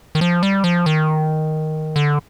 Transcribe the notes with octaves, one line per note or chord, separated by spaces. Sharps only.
D#3
F3
G3
F3
D#3
D3